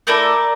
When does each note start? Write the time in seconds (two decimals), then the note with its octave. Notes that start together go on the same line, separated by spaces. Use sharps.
0.07 A3 E4 A4 A#4 D5